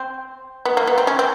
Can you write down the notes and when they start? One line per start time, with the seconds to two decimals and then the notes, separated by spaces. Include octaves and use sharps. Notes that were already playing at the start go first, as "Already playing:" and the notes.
Already playing: C4
0.65 B3
0.77 A#3
0.87 B3
0.98 C4
1.07 C#4
1.19 C4